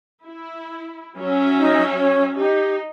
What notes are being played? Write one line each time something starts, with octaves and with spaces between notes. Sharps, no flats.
E4
F#3 C#4 E5
D#4
C#5
D#4 G4